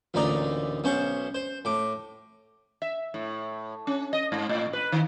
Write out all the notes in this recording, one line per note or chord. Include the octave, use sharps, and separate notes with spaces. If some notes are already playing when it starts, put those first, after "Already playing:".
A1 D2 A#2 D#4 D5 A#5
B1 B2 C#4 C5 C#6
C5
A2 D6
E5
A2
C#4
D#5
G#2
A2
B4
D#3